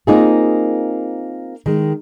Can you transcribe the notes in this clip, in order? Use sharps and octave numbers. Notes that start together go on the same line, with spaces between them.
A#3 C4 D#4 F4 G#4
D#3 G#3